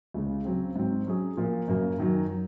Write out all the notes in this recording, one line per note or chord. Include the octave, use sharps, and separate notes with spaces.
C#2 C#3 G#3 C#4
C#3 F#3 C4
G#2 F#3 C4
F#3 C#4 G#4
A#2 F3 A#3 F4
F#2 C#3 F#3 A#3
F#2 D#3 F#3
F#3